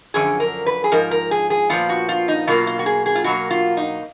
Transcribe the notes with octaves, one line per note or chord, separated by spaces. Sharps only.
F#2 D3 F3 G#4
A#4
B4
G#4
G#2 F3 A#4
A#4
G#4
G#4
A#2 F3 B3 F4
F#4
F4
D#4
B2 F#3 A#3 F4
F4
F#4
G#4
G#4
F4
B2 F#3 A#3 F#4
F4
D#4